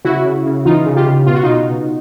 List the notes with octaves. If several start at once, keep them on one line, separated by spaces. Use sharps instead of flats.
C#3 E4 F#4
C#3
C#3
E3 D#4 F4
C#3
F4 G4
C#3
B2 F4
F#4
B2 D#4 F4
B2